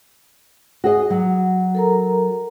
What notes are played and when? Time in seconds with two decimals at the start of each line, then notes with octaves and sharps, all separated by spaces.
0.84 F#4 G#4 D#5
1.10 F#3
1.75 A4 A#4 A#5